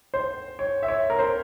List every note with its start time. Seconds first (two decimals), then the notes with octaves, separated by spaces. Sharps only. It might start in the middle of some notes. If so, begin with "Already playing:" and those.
0.14 C5
0.59 C#5
0.83 E5
0.88 C#5
1.10 A#4
1.19 C5